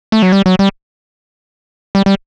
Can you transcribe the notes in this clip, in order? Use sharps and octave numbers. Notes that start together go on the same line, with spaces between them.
A3
F#3
G3
F#3
G3
G3
G3